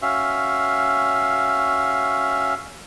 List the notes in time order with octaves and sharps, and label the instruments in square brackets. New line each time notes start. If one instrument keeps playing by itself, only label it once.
[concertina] C#4 F#4 E5 F5